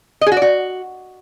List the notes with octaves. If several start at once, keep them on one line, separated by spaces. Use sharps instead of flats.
D#5
G#4
F#4
D5
F#4